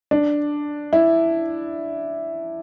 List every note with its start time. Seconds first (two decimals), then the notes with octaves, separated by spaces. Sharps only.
0.11 D4
0.93 E4